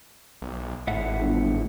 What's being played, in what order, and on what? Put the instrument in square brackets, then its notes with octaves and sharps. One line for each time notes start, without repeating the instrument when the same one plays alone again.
[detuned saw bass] B1
[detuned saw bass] G#1 [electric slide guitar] A2 E5 F#5
[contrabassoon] G1